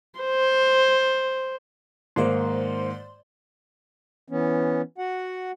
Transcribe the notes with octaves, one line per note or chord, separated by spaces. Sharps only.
C5
G#2 D#3 A#3 C5 D5 C6
E3 B3 C#4
F#4 F#5